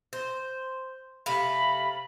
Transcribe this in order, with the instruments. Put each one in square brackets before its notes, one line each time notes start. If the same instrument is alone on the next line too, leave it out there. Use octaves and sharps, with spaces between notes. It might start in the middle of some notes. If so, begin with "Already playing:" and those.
[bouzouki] C5
[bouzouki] C3 A3 F5 [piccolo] B5